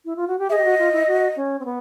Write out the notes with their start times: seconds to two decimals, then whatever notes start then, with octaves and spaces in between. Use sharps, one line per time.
0.05 E4
0.16 F4
0.27 F#4
0.39 G4
0.49 G#4 D#5 E5
0.58 G4
0.64 F#4
0.79 F4
0.93 E4
1.08 F#4
1.36 C#4
1.60 C4
1.65 B3